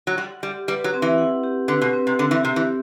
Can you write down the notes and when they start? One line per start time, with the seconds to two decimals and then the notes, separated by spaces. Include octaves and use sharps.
0.07 F#3
0.17 G3 F#5
0.43 G3 G4
0.68 G3 B4
0.84 F#3
0.94 C4
1.02 E3
1.18 F#5
1.43 G4
1.68 D3 B4
1.81 B2
1.93 C4
2.07 C3
2.18 D3 C4
2.31 E3
2.43 C3 G4
2.56 E3